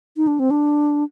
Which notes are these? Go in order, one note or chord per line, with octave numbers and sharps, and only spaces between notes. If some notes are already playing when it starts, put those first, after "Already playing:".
D#4
D4
C4
D4